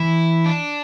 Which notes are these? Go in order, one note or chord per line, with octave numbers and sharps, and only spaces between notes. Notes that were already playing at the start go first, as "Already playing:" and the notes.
Already playing: E3 E4
D4